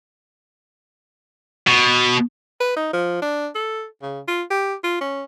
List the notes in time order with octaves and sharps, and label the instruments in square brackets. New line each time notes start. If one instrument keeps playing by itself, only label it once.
[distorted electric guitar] B2
[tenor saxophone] B4
D#4
F3
D4
A4
C#3
F4
G4
F4
C#4